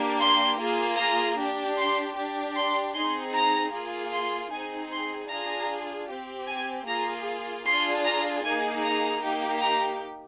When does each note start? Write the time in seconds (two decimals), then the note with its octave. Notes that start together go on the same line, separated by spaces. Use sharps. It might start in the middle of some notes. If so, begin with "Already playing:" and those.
Already playing: A#3 D4 G4
0.20 C6
0.59 A#3 F4 G#4
0.98 A#5
1.38 D4 G4
1.77 C6
2.16 D4 G4
2.56 C6
2.94 C4 D#4 G#4 C6
3.34 A#5
3.73 A#3 F4 G#4
4.12 C6
4.51 C4 D#4 G#4 G#5
4.91 C6
5.29 D4 F4 G#4 A#5
6.09 C4 G4
6.48 G#5
6.87 A#3 F4 G#4 A#5
7.65 D4 F4 G#4 C6
8.04 A#5
8.43 A#3 D#4 G#4 G#5
8.83 A#5
9.22 A#3 D#4 G4
9.61 A#5